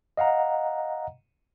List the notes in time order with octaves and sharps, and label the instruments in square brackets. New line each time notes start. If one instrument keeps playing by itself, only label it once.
[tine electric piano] D#5 F5 F#5 A#5